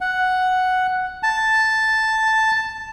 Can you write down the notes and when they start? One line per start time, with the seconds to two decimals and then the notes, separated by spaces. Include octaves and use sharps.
0.01 F#5
1.23 A5